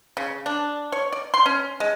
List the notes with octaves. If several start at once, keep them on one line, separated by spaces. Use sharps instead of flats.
C#3
D4
C#5
D5
C6
C#4
G#3